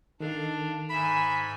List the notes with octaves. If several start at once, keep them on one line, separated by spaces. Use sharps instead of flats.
D#3 D4 A4 F5 A6
G#2 E5 G#5 B5